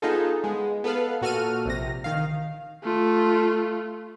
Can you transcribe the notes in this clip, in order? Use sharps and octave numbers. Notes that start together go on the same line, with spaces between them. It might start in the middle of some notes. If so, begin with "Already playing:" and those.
B3 D#4 F4 G#4 A4
G#3 B3
B3 A4 B4 F5
A#2 F#4 A4 F6 D#7
A#1 C3 A#6
D#3 F5
A3 F4